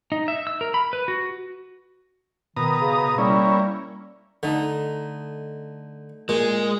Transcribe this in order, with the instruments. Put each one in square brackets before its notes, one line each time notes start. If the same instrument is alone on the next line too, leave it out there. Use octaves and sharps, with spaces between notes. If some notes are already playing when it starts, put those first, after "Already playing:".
[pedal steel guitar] D#4
E5
E6
A#4
B5
B4
F#4
[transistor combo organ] B2 A#5 D#6 [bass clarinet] D#3
[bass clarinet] C#3
[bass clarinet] G3 [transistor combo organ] A#3 C#4 E4
[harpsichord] D3 [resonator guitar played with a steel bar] A3 D#4
[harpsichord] A#2 [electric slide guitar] G#3